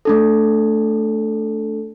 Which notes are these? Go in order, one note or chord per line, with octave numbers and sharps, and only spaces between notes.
A3 D4 A4